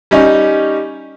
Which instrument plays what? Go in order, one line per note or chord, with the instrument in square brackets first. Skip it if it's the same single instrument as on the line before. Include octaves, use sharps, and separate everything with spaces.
[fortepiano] G3 C#4 D#4